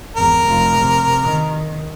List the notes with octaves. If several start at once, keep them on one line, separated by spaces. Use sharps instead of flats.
G#1 E2 A#4
F1 F3
C3
D#3